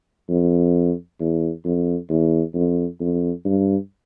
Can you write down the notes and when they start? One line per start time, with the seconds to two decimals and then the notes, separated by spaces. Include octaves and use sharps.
0.29 F2
1.20 E2
1.65 F2
2.10 E2
2.54 F2
3.00 F2
3.45 G2